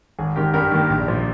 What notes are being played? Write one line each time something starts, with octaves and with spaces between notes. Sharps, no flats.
G#1 G#4
G#2 D#3 G4 A#4
G2 G4 A#4
D#3 A#3
A#1
A#2 F3